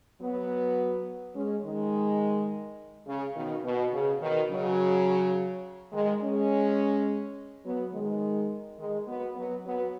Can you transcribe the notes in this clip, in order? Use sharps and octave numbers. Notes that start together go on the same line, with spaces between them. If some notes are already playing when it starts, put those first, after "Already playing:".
F#3 B3
G#3 C#4
D#3 G#3
C#3
B2 D#3
B2
C#3
B2 D#3
C#3 F#3
D#3 G#3
G#3 C#4
F#3 B3
D#3 G#3
D#3 G#3
F#3 B3
F#3 B3
F#3 B3